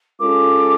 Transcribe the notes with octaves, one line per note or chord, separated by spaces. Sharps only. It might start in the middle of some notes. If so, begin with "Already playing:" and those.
G#3 C#4 F4 A4 D6